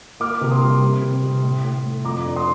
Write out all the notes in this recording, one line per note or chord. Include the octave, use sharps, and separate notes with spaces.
A#3 D6 F6
C3
C6 D#6
G3
C4
C3
C3
A2
A2
A3
F2 A#5 D6
D4
C6 D#6